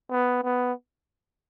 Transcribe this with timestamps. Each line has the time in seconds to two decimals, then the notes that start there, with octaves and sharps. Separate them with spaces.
0.11 B3
0.43 B3